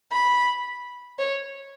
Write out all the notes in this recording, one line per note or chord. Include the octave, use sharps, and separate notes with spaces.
B5
C#5